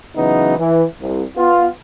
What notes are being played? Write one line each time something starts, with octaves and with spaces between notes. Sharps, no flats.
C#3 E3 F#3 B3 D#4
E3
C2
B3 F4